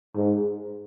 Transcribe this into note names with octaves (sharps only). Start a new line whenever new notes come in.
G#2